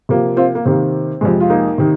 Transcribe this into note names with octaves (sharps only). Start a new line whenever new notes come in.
C3 F3 A#3
C4 F4
A#3
C3 D#3 A#3 C4
F2 C3 G#3
F4
A#3 D#4
C3 D#3